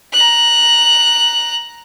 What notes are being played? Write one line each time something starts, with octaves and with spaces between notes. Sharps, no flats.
A#5 F#6